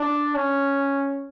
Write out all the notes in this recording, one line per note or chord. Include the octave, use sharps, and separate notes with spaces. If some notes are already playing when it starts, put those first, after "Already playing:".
Already playing: D4
C#4